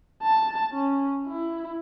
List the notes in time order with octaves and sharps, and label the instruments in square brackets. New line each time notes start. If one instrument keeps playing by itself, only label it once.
[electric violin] A5
C#4
E4